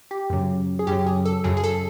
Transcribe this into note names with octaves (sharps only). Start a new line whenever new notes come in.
G4
F#2 C#3 F#3
G#4
F#2 C#3 F#3 G4
G#4
A4
F#2 C#3 F#3 G#4
G#4
A4